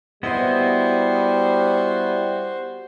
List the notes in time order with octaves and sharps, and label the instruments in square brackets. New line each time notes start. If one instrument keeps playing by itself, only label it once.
[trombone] G3 [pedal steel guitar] B3 E4 D#5 [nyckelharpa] F#4 C5